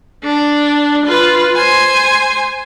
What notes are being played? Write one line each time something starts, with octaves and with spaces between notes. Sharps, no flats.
D4
F4 B4
C5 G#5